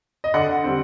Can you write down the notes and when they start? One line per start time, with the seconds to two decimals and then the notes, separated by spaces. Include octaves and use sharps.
0.24 D#5
0.34 D3 D5 F#5
0.64 G3 C4